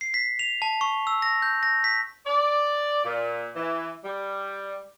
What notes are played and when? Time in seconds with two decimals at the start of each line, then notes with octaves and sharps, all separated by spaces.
0.01 C7
0.14 B6
0.39 F7
0.62 A5
0.81 C#6
1.07 E6
1.22 A#6
1.42 G6
1.63 A#6
1.84 B6
2.25 D5
3.05 A#2
3.56 E3
4.03 G3